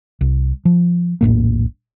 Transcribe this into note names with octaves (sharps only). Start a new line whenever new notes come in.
C2
F3
D#1 A#1 A2 A#3